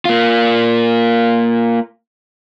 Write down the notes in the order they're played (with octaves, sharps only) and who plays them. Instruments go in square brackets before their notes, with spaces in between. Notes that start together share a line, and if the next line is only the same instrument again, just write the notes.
[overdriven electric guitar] A#3 F4